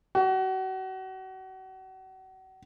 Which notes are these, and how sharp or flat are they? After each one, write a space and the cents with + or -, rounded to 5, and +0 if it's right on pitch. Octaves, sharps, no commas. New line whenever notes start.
F#4 +35